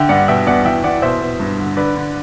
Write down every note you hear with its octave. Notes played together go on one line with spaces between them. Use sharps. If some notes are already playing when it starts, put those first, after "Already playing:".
Already playing: D3 E5 G5
G2 D5 F#5
B2 E5 G5
E2 D5 F#5
E3 E5 G5
E3 D5 F#5
B2 C5 E5
B2
G2
D3
D3 B4 D5
D3